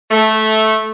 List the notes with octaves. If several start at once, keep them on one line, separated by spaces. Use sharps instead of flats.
A3